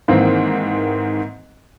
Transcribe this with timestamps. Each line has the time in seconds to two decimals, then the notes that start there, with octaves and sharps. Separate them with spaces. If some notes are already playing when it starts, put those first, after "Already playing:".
0.08 G#2 D#3 E3 A#3 C4